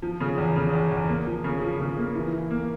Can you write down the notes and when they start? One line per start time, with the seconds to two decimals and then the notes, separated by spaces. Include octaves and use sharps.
0.02 F3
0.20 C#3
0.38 E2
0.56 C#3
0.74 E2
0.91 E2
1.09 A#3
1.27 F3
1.44 C#3
1.61 F3
1.80 C#3
1.98 A#3
2.15 E3
2.33 E3
2.51 A#3